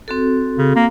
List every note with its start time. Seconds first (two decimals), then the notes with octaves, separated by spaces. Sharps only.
0.08 C4 F#4 A4
0.58 C#3
0.76 A#3